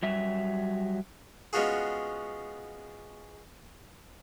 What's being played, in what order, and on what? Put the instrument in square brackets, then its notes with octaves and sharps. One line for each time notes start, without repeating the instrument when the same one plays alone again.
[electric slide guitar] F#3 G3 E5
[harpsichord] G#3 B3 C#4 F4 F#4 G#4